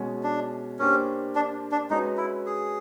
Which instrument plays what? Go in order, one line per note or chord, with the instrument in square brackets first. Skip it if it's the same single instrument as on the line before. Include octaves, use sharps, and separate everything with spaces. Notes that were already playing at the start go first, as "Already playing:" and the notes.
Already playing: [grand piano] B2 G#3 C#4
[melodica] D4
[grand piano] A#3 D4 G4 C5 [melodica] C#4
[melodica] D4
D4
[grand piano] G#3 C#4 F#4 B4 [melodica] D#4
[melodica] E4
G#4